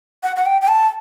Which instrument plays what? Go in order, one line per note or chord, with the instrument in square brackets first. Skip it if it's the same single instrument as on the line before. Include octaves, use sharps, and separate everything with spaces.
[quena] F#5
F#5
G5
G5
A5